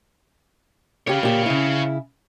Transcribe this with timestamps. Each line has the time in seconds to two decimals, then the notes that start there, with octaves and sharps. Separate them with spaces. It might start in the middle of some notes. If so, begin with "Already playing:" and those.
1.07 C#3 G4 C#5 F5
1.23 A#2 G4
1.46 C#3 E4